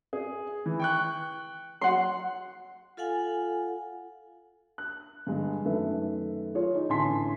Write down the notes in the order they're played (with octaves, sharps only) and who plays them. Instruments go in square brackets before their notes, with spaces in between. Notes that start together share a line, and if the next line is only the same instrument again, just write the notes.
[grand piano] G#4
E3
G5 C#6 F#6
[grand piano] F#3 [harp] F#5 C6
[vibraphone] F4 A4 F5 F#5 G#5
[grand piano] F#6
G2 D3 G#3
F#2 D#3 A3 A4 B4 E5
F4 G#4 C#5
D#4
A1 D3 G#5 A5 C6 B6